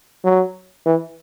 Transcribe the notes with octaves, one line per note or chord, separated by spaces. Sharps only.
F#3
E3